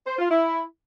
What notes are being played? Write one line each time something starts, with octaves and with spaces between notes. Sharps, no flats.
C5
F4
E4